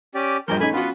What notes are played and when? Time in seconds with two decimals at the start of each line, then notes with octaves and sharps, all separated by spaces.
0.15 C#4 G4 D5
0.48 A#1 G2 F3 A#4 G6
0.60 A3 C#4 D#4 G#5 B5
0.73 B3 C#4 F4 F#4 B4